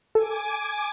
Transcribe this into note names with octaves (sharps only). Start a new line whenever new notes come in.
A4 G#5 D6